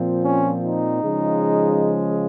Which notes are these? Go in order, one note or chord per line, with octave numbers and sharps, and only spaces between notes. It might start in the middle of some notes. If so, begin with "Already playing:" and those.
Already playing: A#2 F3 C4
C#4
D#4
C#3 F3 G#3